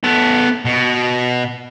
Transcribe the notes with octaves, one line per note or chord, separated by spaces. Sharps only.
B3 A4
B2